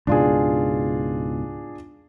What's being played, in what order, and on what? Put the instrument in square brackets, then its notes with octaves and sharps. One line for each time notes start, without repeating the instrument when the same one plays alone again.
[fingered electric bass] C#2 G#2 B2 [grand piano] D4 F4 G#4